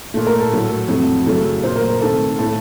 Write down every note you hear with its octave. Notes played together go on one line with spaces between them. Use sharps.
A#2 A3
A#4
A4
A2 F#3 A3
F2 C3 F#3 A3
F#2 C#3 F#3 A3 A4
A#2 A3 C5
A#4
A#4
C3 D#3 A3 A4
A2 A3 A4